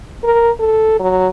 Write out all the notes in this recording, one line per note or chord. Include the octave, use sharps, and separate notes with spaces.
A#4
A4
F#3